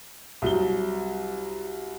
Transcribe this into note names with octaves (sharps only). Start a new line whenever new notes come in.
C2 F#3 G7